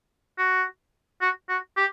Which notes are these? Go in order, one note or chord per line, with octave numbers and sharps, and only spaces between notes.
F#4
F#4
F#4
G4